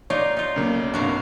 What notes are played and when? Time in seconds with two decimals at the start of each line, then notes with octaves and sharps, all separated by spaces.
0.10 D#4 F4 A#4 C#5 D5
0.37 D#4 F4
0.56 B1 C#3 A#3
0.94 C2 G2 F#4 A#4 F5